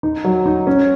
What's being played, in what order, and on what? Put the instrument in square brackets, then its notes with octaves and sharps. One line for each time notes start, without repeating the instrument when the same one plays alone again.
[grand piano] D#4
F#3
D#4
C#4